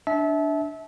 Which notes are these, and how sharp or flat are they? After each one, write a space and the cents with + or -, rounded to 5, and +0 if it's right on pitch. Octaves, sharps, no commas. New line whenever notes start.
D4 +0 E5 -25 A5 -30